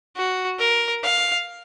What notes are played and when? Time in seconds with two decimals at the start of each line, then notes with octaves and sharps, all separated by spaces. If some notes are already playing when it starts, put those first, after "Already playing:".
0.16 F#4
0.59 A#4
1.04 F5